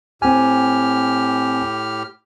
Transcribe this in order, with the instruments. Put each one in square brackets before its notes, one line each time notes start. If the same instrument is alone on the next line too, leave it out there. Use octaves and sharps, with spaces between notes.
[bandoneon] A2 G4 F6 [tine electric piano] C4 G#5